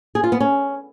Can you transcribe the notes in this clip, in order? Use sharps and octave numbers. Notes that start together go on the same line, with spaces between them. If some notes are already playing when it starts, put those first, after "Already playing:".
G#4
F4
B3
C#4